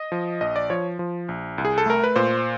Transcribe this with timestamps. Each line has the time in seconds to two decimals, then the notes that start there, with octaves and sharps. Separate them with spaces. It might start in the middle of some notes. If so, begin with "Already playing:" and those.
Already playing: D#5
0.12 F3
0.41 A#1 D#5
0.56 D5
0.70 F3 C#5
0.99 F3
1.29 A#1
1.58 C2
1.65 G#4
1.78 A4
1.86 A3 A#4
2.04 B4
2.16 A#2 C5